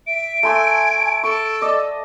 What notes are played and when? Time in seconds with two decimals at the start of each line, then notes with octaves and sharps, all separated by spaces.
0.07 E5 D7
0.43 A3 G#5 C6 E6
1.23 A4 C#6
1.62 D5 D#5